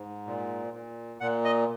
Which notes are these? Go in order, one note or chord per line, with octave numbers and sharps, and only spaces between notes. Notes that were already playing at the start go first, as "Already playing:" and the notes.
Already playing: G#2
A#2
A#2
A#2 F#5
D#5